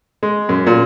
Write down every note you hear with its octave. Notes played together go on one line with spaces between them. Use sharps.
G#3
F#2
A#2